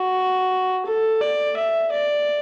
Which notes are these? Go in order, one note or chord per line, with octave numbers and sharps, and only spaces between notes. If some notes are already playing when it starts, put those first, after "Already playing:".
Already playing: F#4
A4
D5
E5
D5